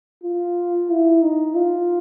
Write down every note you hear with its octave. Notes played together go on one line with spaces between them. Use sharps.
F4
E4
D#4
F4